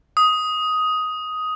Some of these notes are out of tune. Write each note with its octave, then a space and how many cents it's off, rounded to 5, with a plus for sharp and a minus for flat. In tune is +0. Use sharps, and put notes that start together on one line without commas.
D#6 +10